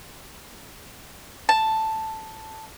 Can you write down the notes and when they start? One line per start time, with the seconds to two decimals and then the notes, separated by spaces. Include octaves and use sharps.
1.49 A5